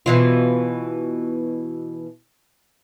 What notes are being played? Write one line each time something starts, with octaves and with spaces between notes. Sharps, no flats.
B2 E3 F4